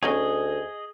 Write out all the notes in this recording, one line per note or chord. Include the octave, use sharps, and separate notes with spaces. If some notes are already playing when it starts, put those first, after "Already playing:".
D2 C#4 D#4 G#4 C#5 D#5